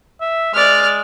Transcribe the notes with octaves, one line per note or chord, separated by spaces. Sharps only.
E5
G#3 D5 F6